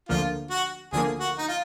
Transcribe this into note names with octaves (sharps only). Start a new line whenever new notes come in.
D2 D3 F3 A#3 F4
F#4
D2 D3 F3 A#3 G#4
F#4
D#4
F4